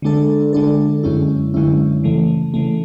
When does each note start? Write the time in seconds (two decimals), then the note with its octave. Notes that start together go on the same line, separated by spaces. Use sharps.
0.02 D3 G#3 D4 A4
0.53 D3 G#3 D4 A4
1.03 F#2 D3 G#3 C#4 E4
1.54 F#2 D3 G#3 C#4 E4
2.04 C#3 E3 A3
2.54 C#3 E3 A3